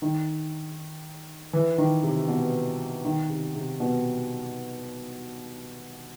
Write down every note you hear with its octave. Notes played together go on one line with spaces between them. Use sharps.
D#3
E3
D#3
C3
B2
D#3
C3
C3
B2